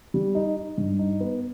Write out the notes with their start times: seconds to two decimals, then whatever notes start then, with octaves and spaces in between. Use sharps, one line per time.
0.14 G3
0.35 D#4
0.57 D#4
0.78 G2
0.99 D#4
1.21 B3